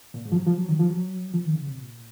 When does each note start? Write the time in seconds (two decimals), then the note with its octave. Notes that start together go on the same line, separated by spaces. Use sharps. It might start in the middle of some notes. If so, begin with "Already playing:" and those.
0.14 A#2
0.25 G#2
0.32 F3
0.36 F#3
0.47 F3
0.58 F#3
0.69 D#3
0.79 F3
0.90 F#3
1.34 F3
1.45 D#3
1.56 C#3
1.67 C3
1.78 A#2